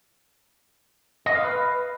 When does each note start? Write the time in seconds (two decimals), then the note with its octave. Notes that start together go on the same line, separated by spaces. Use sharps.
1.26 D#5
1.35 F5
1.44 B4